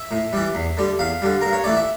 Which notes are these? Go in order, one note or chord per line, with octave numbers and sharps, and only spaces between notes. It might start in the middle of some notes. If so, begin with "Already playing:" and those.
Already playing: E5
A2
E3 G3
E2
D3 G3
E2 F5
D3 G3
G2 A#4
C#5
E3 A3 D5
E5